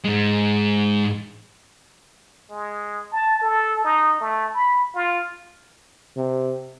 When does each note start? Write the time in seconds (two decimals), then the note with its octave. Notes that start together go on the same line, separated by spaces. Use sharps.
0.04 G#2 G#3
2.51 G#3
3.12 A5
3.42 A4
3.84 D#4
4.21 A3
4.54 B5
4.95 F4
6.17 C3